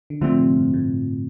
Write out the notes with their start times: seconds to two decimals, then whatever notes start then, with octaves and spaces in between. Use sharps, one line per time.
0.10 D3
0.21 D3 F3 A3 C4
0.33 A2
0.39 C3
0.57 G2
0.74 A2